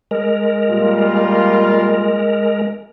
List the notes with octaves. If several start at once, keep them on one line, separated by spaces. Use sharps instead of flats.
G#3 A#4
A#2 G3 F4